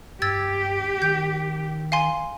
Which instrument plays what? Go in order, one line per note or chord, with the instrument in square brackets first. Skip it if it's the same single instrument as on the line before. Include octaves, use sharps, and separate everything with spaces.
[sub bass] G2 [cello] G4 [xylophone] E6 G#6 A6
[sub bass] D#3 [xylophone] G6
[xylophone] F5 G#5 C6